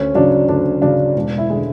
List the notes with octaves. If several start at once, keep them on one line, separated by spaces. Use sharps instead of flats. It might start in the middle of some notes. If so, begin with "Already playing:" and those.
Already playing: D2 C#4
C#3 F#3 D4
D2 D4
C#3 F#3 D4
E1
E4
D3 G#3